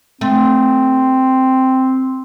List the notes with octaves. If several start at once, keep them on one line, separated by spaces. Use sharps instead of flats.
A3 C4